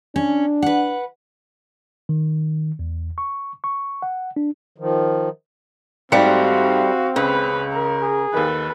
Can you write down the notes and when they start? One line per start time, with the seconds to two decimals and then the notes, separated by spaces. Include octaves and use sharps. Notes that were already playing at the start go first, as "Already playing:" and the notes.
0.16 C#4 D4
0.62 B4 F#5
2.09 D#3
2.79 E2
3.18 C#6
3.64 C#6
4.02 F#5
4.36 D4
4.78 D#3 F3
6.12 G#2 G3 A3 C4 F#4 F5 C#7
7.16 C#2 C#3 B4
7.72 A#4
8.02 G#4
8.34 D#2 D#3 A4 B4